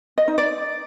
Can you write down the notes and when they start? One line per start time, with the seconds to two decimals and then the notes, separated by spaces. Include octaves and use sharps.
0.18 D#5
0.28 D#4
0.38 D5